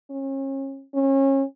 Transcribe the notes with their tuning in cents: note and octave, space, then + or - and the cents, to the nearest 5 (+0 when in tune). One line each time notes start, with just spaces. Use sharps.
C#4 -35
C#4 -30